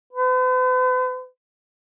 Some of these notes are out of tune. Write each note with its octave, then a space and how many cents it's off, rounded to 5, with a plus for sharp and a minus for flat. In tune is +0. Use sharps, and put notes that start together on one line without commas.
B4 +45